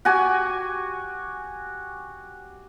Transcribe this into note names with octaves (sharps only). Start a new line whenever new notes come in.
F#4 G4 G#5